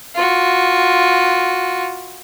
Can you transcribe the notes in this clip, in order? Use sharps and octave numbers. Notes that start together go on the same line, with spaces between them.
F4 F#4